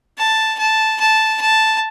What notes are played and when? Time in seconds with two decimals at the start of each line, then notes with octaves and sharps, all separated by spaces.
0.18 A5
0.59 A5
1.00 A5
1.41 A5